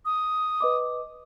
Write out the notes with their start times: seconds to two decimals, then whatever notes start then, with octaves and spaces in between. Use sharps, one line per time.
0.05 D#6
0.60 B4 D#5 D6